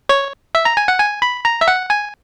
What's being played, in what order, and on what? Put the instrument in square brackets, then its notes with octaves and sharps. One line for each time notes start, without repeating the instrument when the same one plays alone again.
[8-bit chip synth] C#5
E5
A#5
G#5
F#5
G#5
B5
A#5
E5
F#5
G#5